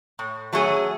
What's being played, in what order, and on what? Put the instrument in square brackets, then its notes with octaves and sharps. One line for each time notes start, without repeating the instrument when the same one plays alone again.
[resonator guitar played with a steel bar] A2
F#3 A3 C#4 G#4